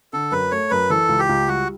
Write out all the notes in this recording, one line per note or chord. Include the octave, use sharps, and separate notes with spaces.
D3 A4
F#2 B4
A3 C#5
F#2 B4
E3 A4
C#2
G4
C#2
G3 F#4